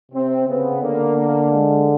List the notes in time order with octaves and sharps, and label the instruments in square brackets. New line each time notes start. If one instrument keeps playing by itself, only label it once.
[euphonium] C3 [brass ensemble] C4
[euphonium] C#3 [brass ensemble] B3
[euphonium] D3 [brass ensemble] A#3
[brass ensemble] A#3
G#3